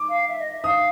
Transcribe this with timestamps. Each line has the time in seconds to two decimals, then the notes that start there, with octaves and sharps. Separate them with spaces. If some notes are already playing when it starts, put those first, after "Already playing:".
Already playing: D6
0.09 F5
0.27 E5
0.39 D#5
0.52 E5
0.64 F5 D#6